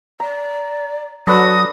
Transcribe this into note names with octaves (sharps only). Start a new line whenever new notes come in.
D5 A#5
F#3 D4 F#4 A4 B4 D#6